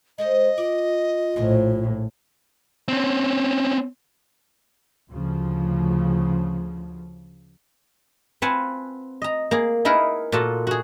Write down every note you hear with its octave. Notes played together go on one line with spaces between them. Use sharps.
G#3 A4 C5 D#5
F4 D5
A#1 A2 C#3 F3 A#3
C4 C#4
D2 C#3 F3
C4 F4 B4 F#5 G#5 A5
D#5 A#5
A#3 G#4
D#4 E4 G#4 A#4 B4
A#2 F4 F#4 A4 A5
F#4 G#4